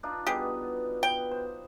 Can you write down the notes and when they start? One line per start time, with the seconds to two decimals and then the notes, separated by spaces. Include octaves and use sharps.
0.03 D4 D#4 F4
0.27 B2 G3 B3 G4 G#4
1.03 B4 G5
1.31 C5